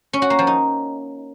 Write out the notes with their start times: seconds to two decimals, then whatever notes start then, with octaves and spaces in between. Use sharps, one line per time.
0.13 C#4
0.22 F#4
0.30 A#3
0.39 F3
0.47 D#4